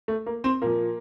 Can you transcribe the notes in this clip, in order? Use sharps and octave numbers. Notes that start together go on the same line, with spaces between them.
A3
A#3
C4
A#2 F3 A#3